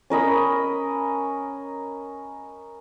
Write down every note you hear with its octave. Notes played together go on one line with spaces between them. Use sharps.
C#4 A#4 D#5 B5